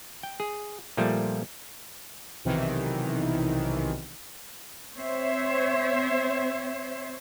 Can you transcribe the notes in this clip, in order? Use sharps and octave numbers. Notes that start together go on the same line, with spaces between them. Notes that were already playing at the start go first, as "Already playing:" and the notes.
G5
G#4
A#2 F3 G3 A3
B1 C3 D#3 E3
C4 C5 C#5 E5